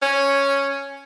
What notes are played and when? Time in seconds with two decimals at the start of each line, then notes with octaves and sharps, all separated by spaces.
0.02 C#4